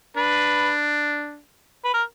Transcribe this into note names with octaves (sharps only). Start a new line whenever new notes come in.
D4 B4
B4
A#4